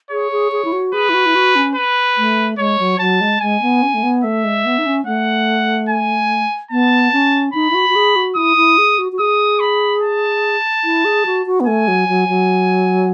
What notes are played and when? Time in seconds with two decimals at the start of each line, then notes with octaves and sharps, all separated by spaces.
0.11 G#4 C#5
0.32 G#4
0.52 G#4
0.65 E4
0.72 F#4
0.94 G#4 B4
1.09 E4
1.14 F#4
1.26 E4
1.35 F#4
1.56 C#4
1.75 B4
2.17 A3
2.58 G#3 C#5
2.79 F#3
2.99 F#3 A5
3.21 G#3
3.41 G#3 G#5
3.62 B3
3.83 C#4
3.94 A3
4.03 B3
4.24 A3 E5
4.44 G#3
4.65 B3
4.78 D#4
4.86 C#4
5.06 A3 F#5
5.89 G#5
6.71 B3 A5
7.13 C#4
7.53 D#4 B5
7.71 E4
7.75 F#4
7.90 F#4
7.96 G#4
8.16 F#4
8.36 E4 D#6
8.57 E4
8.78 G#4
8.99 F#4
9.12 F#4
9.19 G#4 D#6
9.60 B5
10.02 A5
10.84 E4
11.05 G#4
11.26 F#4
11.46 F#4
11.60 B3
11.67 A3 G#5
11.88 F#3
12.09 F#3
12.28 F#3